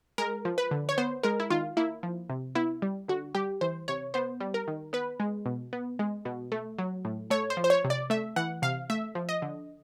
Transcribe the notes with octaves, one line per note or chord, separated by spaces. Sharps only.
G#3 A#4
F3
B4
D3
C#5
B3 C5
G#3 A#4
E4
D#3 F4
A#3 E4
F3
C3
B3 E4
G3
D3 F#4
G3 G4
E3 C5
C3 C#5
B3 C5
G3
A#4
D#3
B3 B4
G#3
B2
B3
G#3
B2
A3
F#3
A2
A3 C#5
C5
F3
C5
C#5
C3
D5
A3 E5
E3 F#5
C3 F5
A3 E5
F3
D#5
D3